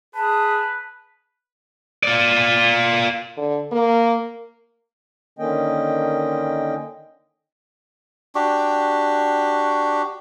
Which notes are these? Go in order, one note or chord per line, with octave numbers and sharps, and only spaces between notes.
G#4 B4 A5
F4 D5
D3
A#3
D3 D#3 A#3 C#4 D#5 G5
D4 F#4 G4